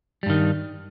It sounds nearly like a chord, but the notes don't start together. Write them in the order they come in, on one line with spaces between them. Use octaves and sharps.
G3 G2 D#3